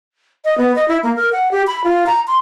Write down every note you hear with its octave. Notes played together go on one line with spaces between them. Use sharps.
D#5
B3
D#5
E4
A#3
A#4
F#5
G4
B5
F4
A#5
C6